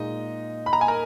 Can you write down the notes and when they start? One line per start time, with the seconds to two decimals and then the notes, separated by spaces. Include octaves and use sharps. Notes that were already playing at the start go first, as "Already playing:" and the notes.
Already playing: A#2 G#3 D#4 D#5
0.66 B5
0.73 A#5
0.81 G#5
0.88 A#4 A#5